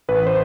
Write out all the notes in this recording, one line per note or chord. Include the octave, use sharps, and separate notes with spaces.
A1 B4
C5